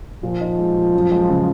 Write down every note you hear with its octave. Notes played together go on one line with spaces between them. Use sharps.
A#2 F3
D#4
G#3
A#2
F#2
G#3
C#3